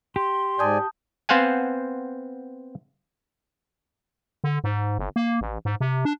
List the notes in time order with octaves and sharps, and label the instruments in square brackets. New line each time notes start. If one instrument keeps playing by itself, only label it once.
[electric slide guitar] G4 [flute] C6
[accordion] G#2 D5 G#5 [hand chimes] A5 D#6 G6
[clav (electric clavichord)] B3 C4 C5 F5 F#5 G#5
[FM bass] D3
G#2
G1
A#3
A1
G#2
C3
D4